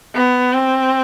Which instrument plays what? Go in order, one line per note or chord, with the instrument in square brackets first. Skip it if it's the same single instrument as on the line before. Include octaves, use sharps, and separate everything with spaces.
[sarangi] B3
C4